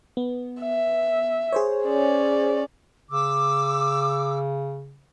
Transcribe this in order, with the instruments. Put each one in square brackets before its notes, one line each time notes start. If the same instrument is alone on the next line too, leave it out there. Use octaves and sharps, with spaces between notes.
[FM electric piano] B3
[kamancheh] E5
[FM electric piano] G#4 C5 C#5
[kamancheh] C#4 D5
[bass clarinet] C#3 [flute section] D6 E6